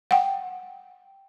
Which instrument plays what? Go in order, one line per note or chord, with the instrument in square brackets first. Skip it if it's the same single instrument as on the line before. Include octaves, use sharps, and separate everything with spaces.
[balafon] F#5 G5